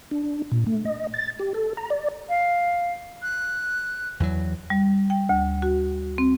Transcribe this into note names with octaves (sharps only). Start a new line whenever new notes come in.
D4
A#2
A3
D#5
A6
G4
A4
A#5
D5
F5
F#6
E2 E3 F#3
G3
G5
D2
F#4
C4